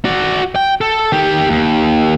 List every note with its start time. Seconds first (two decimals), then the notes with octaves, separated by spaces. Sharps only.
0.05 F#4 D5
0.56 G5
0.81 A4
1.12 D#3 G4
1.49 D#2